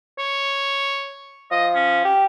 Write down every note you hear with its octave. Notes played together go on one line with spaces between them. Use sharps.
C#5
F3 D#5
C#4
G4